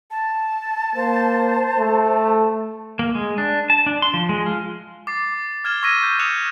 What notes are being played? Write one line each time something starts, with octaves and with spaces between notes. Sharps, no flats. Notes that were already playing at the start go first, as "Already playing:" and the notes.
A5
A#3 C5
A3
A#3
G#3
D4
A5
D4
C6
F3
G#3
F4
D6 A6 C7
F6 G#6 E7 G7
C#6 E6 G#6 A#6 B6 D#7
G6
D#6 F#6 C#7 E7 F7